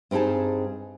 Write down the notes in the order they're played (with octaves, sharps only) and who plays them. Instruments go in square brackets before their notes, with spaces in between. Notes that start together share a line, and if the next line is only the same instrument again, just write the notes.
[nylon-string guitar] G2 C4 D#4 G#4 A5